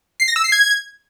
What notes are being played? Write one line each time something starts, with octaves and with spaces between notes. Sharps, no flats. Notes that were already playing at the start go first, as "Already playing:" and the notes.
C7
A#6
E6
C7
G#6